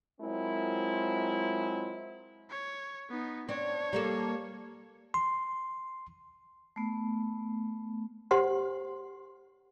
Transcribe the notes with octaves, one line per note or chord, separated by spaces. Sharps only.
F#3 G#3 C4 E4 F4 A#4
C#5
B3 D#4
C4 D4 C#5
G3 A#3 A4
C6
A3 B3
G4 C5 F#5 C6